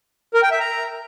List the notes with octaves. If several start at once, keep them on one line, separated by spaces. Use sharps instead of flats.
A#4
G5
E5
A#5